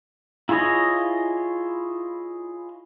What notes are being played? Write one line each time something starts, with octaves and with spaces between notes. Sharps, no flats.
E4 F4 G#4 C#5 D#5